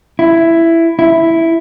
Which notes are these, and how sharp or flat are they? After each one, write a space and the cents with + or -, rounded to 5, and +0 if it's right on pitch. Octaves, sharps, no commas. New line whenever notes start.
E4 +10
E4 +0